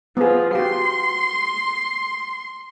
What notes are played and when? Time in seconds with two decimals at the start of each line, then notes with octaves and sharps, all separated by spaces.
0.17 F3 B3 G#4
0.55 F#4 G4 C6